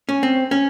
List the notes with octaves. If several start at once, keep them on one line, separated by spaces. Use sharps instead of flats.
C#4
C4
C#4